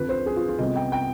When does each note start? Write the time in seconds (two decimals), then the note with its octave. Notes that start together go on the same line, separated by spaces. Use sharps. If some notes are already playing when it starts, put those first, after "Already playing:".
Already playing: F2 D3 F3 B4
0.09 C5
0.26 G#4
0.37 F4
0.48 F4
0.59 C3 G3 B3 D#5
0.76 G5
0.92 G5